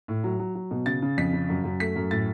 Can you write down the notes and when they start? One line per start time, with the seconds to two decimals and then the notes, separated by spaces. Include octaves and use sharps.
0.08 A2
0.24 F#3
0.39 F#3
0.55 F#3
0.71 B2
0.86 C#3 A6
1.02 C#3
1.18 F2 B6
1.33 C#3
1.49 F#2
1.64 F#2
1.80 A3 B6
1.96 F#2
2.11 A2 A6